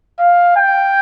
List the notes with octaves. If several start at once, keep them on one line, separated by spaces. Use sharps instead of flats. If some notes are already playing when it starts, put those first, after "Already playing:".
F5
G5